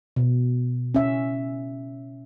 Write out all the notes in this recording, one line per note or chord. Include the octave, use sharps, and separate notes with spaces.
B2
C#4 E5